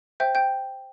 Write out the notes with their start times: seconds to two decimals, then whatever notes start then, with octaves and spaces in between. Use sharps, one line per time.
0.20 C5 E5 G5 G6
0.35 G5 G6